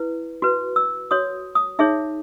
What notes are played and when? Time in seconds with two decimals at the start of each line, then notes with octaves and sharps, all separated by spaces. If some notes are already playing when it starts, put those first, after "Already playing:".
Already playing: E4 B4
0.42 F#4 B4
0.76 E6
1.11 F#4 C#5 D#6
1.55 D#6
1.79 D#4 G#4 C#5 E5